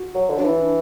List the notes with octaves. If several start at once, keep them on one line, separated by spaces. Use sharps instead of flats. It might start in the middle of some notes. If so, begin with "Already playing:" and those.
Already playing: F#4
F#3
D3
F#3 D4
E3 E4
D4